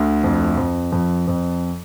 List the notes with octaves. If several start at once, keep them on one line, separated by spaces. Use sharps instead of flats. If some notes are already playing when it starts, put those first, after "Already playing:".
Already playing: D2
F2
F2
F2
F2